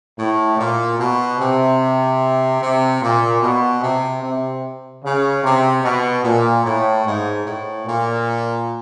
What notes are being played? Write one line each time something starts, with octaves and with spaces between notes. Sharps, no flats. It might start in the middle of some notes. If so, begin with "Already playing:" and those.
A2
A#2
B2
C3
C3
A#2
B2
C3
C3
C#3
C3
B2
A#2
A2
G#2
A2
A#2